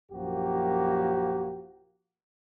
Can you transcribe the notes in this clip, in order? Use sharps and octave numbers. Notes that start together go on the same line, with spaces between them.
A#1 F#2 F3 A#3 F#4 G4